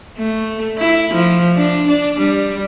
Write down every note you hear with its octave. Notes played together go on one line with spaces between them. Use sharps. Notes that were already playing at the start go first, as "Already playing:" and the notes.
A3
E4
F3
D4
D4
G3